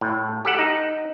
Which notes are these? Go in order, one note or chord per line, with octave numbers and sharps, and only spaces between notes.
A2
G4 A4 F#5
D#4